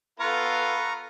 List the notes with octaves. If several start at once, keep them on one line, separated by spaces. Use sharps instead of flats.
B3 F4 A4 B4 A#5 C#6 F6